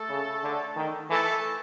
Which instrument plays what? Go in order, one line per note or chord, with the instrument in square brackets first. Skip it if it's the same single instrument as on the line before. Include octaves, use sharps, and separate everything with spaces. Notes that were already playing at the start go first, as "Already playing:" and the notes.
Already playing: [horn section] A3 A4
[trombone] C#3
D3
D#3
[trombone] E3 [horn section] A3 A4